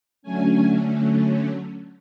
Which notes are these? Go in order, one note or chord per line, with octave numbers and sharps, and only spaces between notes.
D3 F#3 A3 C#4 G#5